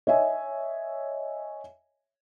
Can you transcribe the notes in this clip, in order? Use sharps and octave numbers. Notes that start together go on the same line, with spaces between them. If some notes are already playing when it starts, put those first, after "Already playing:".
C#5 D#5 E5 G#5